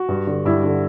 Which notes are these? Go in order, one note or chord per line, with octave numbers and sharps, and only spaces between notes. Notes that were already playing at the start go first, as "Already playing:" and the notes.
Already playing: F#4
G2
D3
G2 E4
D3